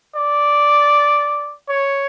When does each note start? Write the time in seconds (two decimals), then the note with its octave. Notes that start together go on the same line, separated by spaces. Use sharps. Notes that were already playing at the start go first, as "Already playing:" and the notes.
0.15 D5
1.69 C#5